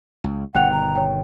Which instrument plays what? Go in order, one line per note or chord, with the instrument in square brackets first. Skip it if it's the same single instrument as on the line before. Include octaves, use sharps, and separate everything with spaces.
[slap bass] C#2
[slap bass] G1 B2 D#3 [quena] F#5 [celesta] G5 F#6 F7
[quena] A#5
[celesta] C#5 G5